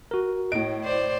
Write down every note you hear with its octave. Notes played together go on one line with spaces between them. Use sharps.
F#4 A#4
A2 D#5 D7
C5 D5